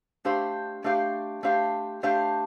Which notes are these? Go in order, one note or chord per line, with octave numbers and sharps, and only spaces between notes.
A3 D4 G4 C5 F5
A3 D4 G4 C5 F5
A3 D4 G4 C5 F5
A3 D4 G4 C5 F5